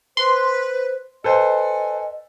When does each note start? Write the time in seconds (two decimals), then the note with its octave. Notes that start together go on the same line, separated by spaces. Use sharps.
0.17 B4 C5 C6
1.24 A4 B4 C5 D#5 G#5